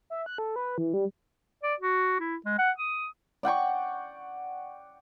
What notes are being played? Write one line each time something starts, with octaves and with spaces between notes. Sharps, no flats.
E5
F#6
A4
B4
E3
G3
D5
F#4
E4
G#3
F#5
D#6
D5 F#5 G5 C#6